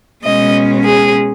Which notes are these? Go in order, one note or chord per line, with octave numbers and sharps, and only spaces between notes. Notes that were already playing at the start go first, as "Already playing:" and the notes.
B2 G#3 C#4 D#5
G#4